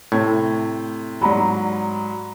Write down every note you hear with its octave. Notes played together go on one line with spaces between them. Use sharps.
A2 C3 G#6
G#2 F#3 D5 A#5 B5